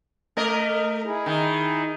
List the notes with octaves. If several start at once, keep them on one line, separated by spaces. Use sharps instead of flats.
A3 A#4 D#5
D#4 E4 G#4
D#3